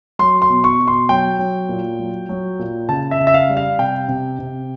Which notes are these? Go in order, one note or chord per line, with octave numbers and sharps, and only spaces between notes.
F#3 C6
C6
B2
C#6
B2
C6
F#3 G5
F#3
A#2
F#3
F#3
A#2
C#3 A5
E5
C#3
E5
F5
G3
F5
C3 G5
C3
C3